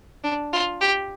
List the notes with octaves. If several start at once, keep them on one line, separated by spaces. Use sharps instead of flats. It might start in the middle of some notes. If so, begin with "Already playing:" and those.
D4
F4
G4